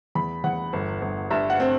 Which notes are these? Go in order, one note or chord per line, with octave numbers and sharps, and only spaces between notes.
E2 B5
E2 F#5
G1
G1
G2 E5
F#5
C4